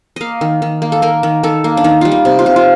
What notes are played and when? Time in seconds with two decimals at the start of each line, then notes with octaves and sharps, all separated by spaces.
0.16 A#3 D#5 F5
0.41 D#3
0.62 D#3
0.82 A#3
0.92 A4
1.02 A#3 A#4
1.23 D#3
1.43 D#3 A4
1.64 A#3
1.77 D4
1.84 D#3 D#4
2.01 G3 F4
2.12 D#4
2.25 C3
2.39 F4
2.46 C3
2.56 F4